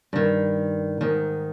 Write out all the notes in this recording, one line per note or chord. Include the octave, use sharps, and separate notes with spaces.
G2 D#3
G#2 D#3